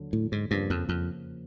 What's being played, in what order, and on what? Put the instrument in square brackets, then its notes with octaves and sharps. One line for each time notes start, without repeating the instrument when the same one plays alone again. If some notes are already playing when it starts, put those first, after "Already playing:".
Already playing: [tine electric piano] D#2 D3 F#3
[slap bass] A2
G#2
[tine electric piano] E2 C#3 F3 A#3 [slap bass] G2
[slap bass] F2
F2